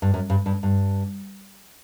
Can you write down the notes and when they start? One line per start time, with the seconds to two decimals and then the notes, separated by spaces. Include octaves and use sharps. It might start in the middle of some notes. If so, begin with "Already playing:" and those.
0.02 G2
0.14 F#2
0.30 G2
0.46 G2
0.63 G2